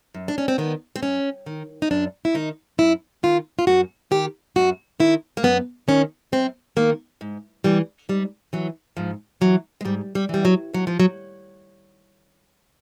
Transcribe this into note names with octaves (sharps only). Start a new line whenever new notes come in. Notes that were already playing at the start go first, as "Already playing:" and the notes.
F#2
D4
C#4
C4
D#3 B3
C4
F#2 C#4
D#3
D#4
F#2 D4
E4
D#3 D#4
F#2 E4
D#3 F4
F4
F#2 F#4
D#3 G4
F#2 F#4
D#3 E4
A#3
F#2 B3
D#3 C#4
F#2 C4
D#3 A#3
G#2
E3 G3
G#2 G3
E3 F#3
G#2 F3
E3 F#3
G#3
G#2 G3
G3
E3 G3
F#3
D#2 F#3
F3
F#3